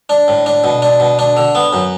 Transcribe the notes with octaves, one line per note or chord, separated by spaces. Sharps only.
D4
A2
D4
B2
D4
B2
D4
D3
B3
F#2